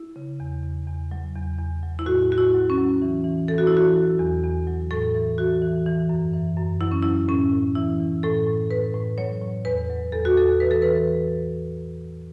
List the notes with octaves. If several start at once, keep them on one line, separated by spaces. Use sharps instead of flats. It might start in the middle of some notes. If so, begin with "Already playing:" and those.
Already playing: E4
C#3
E2
E2
E2
F#3
E2
E2
F#3
E4
A2 F#4
A2 F#4
E4
F#3
C#4
F#3
E3
E3
E3 A4
F#4
E4
E3 F#4
F#3
E2
E2
F#3
A2 A4
E3
E3 F#4
E3
E3
F#2
E3
F#2
F#3 E4
C#4
F#3 E4
A2 C#4
A2
E3 E4
E3
A2 A4
A2
A2 B4
A2
F#3 C#5
A2
E2 B4
F#3
E2 A4
F#4
E2 A4
E3 B4
A4
E3 B4